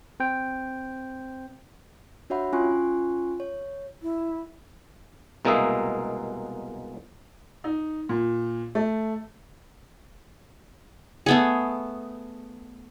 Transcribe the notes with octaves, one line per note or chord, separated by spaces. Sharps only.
C4 C5 G5
D4 F#4 C#5 E5 F#5 B5
C#4 F4 G#5 C6 C#6 F#6
C#5
E4
C2 B2 G#3 A#3 D#5 E5
D#4
A#2
A3
A3 B3 G#4